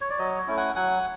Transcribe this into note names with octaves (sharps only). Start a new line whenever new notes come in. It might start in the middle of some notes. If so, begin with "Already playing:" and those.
C#5
D5
F#3 C#5 D#5
A3 C#4 E4
F#5 G#5
F#3 F#5 G#5